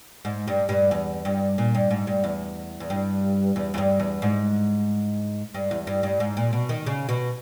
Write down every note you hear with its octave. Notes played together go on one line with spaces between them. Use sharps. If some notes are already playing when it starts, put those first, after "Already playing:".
G#2
G2
G2
E2
G2
A#2
G2
G#2
G2
E2
E2
G2
E2
E2
G2
E2
G#2
G2
E2
G2
G2
G#2
A#2
B2
D#3
C#3
B2